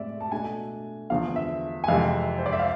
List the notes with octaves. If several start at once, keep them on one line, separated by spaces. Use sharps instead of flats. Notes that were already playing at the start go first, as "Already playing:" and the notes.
Already playing: A2 G#3 C4 D5 E5
A5
B2 A3 D4 G#5
E2 D3 F3 B3 F5
E5
G#5
F2 C3 E3 G#3 F5
C5
D5
E5
F5